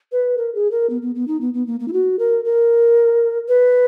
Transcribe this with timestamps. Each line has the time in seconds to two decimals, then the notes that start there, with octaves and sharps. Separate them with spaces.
0.12 B4
0.37 A#4
0.55 G#4
0.71 A#4
0.90 B3
1.02 B3
1.15 B3
1.28 D#4
1.41 B3
1.54 B3
1.67 A#3
1.80 A#3
1.88 E4
1.93 F#4
2.19 A#4
2.45 A#4
3.48 B4